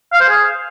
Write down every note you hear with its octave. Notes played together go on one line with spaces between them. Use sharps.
F5
C5
G#4